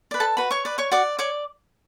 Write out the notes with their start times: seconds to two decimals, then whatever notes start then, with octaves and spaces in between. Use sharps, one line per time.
0.11 B4 D5
0.20 A4 A5
0.37 F#4 B4 B5
0.51 C#5 C#6
0.65 B4 D5
0.78 C#5 C#6
0.92 F#4 D5 D6
1.19 C#5 D5 D6